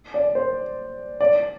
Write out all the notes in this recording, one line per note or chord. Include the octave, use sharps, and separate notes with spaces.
D5
C5
D5